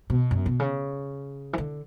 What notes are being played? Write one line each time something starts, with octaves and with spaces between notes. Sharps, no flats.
B2
F#2
B2
C#3
E3
D3